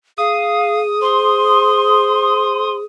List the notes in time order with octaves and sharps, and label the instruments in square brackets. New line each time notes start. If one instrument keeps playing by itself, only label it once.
[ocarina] G#4 [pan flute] F5 [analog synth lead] D#6
[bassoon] C5 [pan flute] C6